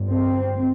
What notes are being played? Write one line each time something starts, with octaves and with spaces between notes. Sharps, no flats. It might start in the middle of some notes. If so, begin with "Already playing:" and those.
Already playing: G1 G2
C4